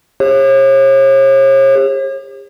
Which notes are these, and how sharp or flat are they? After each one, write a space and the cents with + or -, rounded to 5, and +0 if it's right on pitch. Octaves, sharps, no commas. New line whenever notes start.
G4 +45 C#5 -40